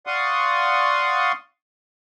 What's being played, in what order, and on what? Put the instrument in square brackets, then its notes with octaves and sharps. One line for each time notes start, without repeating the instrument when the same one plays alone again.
[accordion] D5 F5 F#5 C6 C#6 D#6